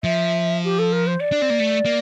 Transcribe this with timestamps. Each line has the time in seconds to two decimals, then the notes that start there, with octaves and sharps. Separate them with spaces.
0.03 F3 E5
0.64 G4
0.78 A4
0.92 A#4
1.07 C5
1.20 D5
1.32 D4
1.42 C4
1.50 A#3
1.60 A3
1.85 A#3